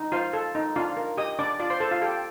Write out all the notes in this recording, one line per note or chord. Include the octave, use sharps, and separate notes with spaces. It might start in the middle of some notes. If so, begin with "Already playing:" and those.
Already playing: D#4
F4 C5 F5
A4
D#4
D4 F4 F5
A#4
G4 D#5 D#6
D4 D5 D6
F4 D5 D6
C5 C6
A4 C5 A5
F4 F5
G4 A4 G5